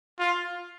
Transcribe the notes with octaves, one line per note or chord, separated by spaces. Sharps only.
F4